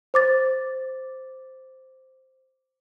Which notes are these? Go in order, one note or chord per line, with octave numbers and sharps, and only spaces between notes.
C5 D6 A6